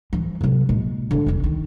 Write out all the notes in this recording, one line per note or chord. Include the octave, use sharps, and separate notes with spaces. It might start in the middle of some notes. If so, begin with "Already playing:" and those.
E3 F3
C3 F#3
A#2 G#3
D3 E4
F1 E2
D#3